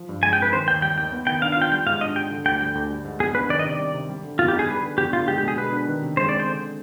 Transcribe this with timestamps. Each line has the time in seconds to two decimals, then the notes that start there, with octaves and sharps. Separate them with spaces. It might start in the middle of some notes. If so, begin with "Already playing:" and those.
Already playing: F3
0.09 G2
0.23 G#3 G#5
0.33 G5
0.39 C4 B4
0.52 D#3 C5
0.67 D#2 G5
0.82 G3 G5
0.98 D#2 G5
1.12 B3
1.27 D#3 G5
1.42 D4 F5
1.52 F5
1.56 F4
1.62 G5
1.72 G3 G5
1.86 G#2 F5
2.01 D4 D#5
2.16 G4 G5
2.31 D3
2.45 D2 G5
2.61 G3 G5
2.75 D2
2.91 G3
3.05 G#2
3.20 B3 G#4
3.35 D4 B4
3.49 D#3 D5
3.59 D#5
3.65 C3 D5
3.79 G3
3.94 C3
4.09 G3
4.23 D3
4.39 B3 F4
4.48 G4
4.54 D#4
4.59 G#4
4.69 G3 B4
4.83 D3
4.98 B3 G4
5.13 D3 F4
5.28 G#3 G4
5.38 G4
5.43 B2 G#4
5.58 B3 B4
5.72 D4
5.87 D#3
6.02 C3
6.17 G#3 C5
6.29 C4 D5
6.40 C5
6.46 D3